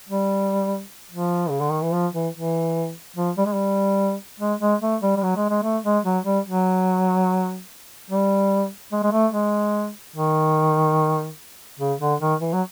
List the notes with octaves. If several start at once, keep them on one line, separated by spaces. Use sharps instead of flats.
G3
F3
C#3
D3
D#3
E3
F3
E3
E3
F3
G3
G#3
G3
G#3
G#3
A3
G3
G3
F#3
G#3
G#3
A3
G#3
F#3
G3
F#3
G3
G#3
G#3
A3
G#3
D#3
C#3
D3
D#3
E3
F#3